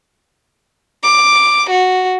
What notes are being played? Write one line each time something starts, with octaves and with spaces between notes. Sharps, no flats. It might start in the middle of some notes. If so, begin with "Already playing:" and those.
D6
F#4